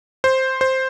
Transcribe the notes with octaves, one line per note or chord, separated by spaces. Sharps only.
C5
C5